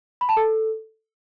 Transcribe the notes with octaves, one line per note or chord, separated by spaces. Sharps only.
B5
A5
A4